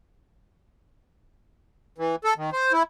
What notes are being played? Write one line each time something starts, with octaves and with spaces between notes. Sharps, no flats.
E3
A4
D#3
C5
E4